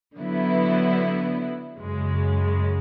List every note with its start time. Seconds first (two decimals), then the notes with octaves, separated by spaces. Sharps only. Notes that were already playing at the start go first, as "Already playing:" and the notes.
0.17 D3 F#3 B3 E4
1.77 F#2 C#3 G#3